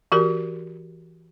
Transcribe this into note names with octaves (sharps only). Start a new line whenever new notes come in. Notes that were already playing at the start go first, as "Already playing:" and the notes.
E3 F#4 G4 A#4